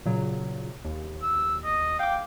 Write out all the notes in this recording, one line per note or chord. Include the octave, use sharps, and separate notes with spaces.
A#2 C#3 F#3
D#2
E6
D#5
F5 G5 D6